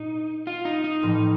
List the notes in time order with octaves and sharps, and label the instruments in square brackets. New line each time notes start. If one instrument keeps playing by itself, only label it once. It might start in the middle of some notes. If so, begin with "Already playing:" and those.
Already playing: [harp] A#2 [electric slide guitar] D#4
[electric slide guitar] F4
D#4
D#4
[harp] A1 A2 F3 C4 F4